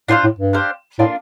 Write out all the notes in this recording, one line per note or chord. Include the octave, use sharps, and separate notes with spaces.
A2 D4 F4 C5 F5
A2
G2
D4 G4 C5 F5
A2 A#3 D4 F4